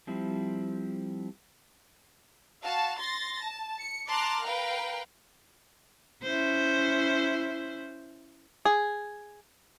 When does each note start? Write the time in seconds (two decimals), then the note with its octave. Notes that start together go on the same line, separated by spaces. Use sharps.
0.07 F3 G3 C4 E4
2.64 F#4 F5 A5
2.98 C6 A6 A#6
3.42 A5
3.79 C#7
4.09 A5 A#5 C6 D6 F6 F#6
4.43 A#4 B4 F5 G5
6.23 C#4 E4 C5
8.65 G#4